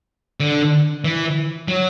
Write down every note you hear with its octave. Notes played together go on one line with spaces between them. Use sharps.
D3
E3
F#3